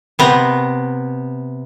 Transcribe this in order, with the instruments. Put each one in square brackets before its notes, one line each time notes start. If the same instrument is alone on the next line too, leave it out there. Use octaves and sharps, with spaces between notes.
[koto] C3 B3 A#5